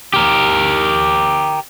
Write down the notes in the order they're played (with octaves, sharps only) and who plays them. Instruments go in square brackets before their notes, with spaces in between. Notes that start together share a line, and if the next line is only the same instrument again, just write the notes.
[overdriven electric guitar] G4 A#4